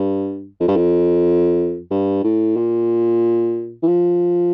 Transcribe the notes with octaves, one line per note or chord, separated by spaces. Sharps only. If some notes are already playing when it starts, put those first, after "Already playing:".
Already playing: G2
F2
G2
F2
G2
A2
A#2
E3
F3